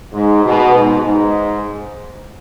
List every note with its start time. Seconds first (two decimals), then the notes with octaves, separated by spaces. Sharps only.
0.12 G#2
0.43 B2
0.74 G#2
1.03 G#2